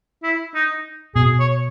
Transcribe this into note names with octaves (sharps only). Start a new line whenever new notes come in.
E4
D#4
B2 G#4
C#5